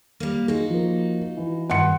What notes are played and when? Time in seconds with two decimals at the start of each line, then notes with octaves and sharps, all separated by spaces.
0.20 G3 A#3
0.48 D#4 F4 F#4 G#4
0.70 F3 A#3
1.37 E3
1.70 G2 D#3 F#5 C6 C#7